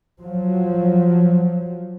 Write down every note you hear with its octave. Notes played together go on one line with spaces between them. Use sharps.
F3 F#3